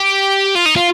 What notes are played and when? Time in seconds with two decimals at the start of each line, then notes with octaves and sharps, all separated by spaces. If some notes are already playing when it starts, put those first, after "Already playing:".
Already playing: G4
0.55 F4
0.65 D#4
0.76 F4